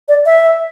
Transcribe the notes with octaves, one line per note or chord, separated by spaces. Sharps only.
D5
E5